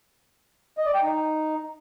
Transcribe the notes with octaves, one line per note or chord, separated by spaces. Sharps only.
D#5
D5
G5
D#4